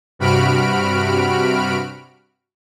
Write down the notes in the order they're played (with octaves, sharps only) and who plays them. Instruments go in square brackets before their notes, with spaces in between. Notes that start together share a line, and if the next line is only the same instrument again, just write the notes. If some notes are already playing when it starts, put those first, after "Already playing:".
[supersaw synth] G2 C3 F#4 B5 F6 D7